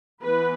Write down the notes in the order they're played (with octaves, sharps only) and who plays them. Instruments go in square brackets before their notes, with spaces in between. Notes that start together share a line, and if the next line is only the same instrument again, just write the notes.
[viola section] E3 B3 B4